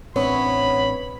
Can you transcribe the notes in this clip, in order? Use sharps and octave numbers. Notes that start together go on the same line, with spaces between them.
A1 B3 C4 D4 E4 C#5 B5